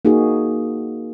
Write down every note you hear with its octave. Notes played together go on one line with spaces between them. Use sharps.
A#3 D#4 F#4 G#4